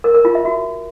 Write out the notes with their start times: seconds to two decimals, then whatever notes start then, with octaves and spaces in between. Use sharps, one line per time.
0.04 A#4
0.14 A#4
0.25 F4
0.35 E5
0.45 F#4